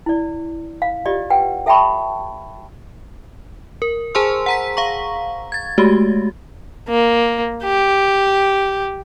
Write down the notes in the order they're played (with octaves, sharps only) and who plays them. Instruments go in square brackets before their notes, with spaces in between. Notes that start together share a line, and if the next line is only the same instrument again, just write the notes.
[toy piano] E4 D5
F5
F4 G4 D5 D#5
B4 F#5 G5
A4 E5 G5 A5 B5 C#6
[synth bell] A#4
G#4 C5 G#5 A5 C6 E6
F#5 A#5 B6
F5 A#5 C#6
G#6 A6
G#3 A3 F#4 G4
[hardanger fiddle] A#3
G4